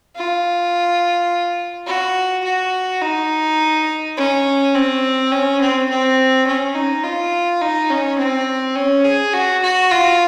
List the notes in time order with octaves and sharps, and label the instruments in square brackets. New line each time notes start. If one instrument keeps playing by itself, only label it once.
[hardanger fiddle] F4
F#4
F#4
D#4
C#4
C4
C#4
C4
C4
C#4
D#4
F4
D#4
C#4
C4
C#4
G#4
F#4
F#4
F4